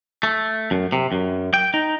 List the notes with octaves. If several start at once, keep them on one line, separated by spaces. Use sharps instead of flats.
A3
F#2
C3
F#2
G5
D#4